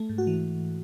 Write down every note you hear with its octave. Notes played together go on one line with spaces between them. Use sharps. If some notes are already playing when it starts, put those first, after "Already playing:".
Already playing: A3
G#2
F#4
E3